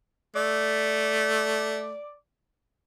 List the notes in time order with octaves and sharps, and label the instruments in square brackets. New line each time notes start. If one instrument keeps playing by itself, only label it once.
[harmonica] A3 [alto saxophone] D5